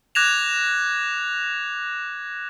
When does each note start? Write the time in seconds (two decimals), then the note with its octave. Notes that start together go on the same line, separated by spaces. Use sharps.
0.15 D6 F#6 G#6 A#6 E7 F7